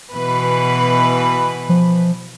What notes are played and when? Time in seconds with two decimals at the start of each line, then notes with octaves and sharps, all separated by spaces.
0.13 B2 E3 B4
1.69 F3